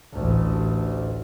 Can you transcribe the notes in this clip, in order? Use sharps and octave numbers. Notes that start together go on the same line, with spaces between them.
A1 D2